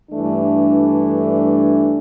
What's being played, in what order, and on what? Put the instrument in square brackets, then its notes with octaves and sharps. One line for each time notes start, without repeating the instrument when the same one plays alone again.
[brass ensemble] G2 E3 A3 D4